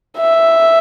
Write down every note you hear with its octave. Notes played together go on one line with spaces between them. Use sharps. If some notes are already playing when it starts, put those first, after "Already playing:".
E5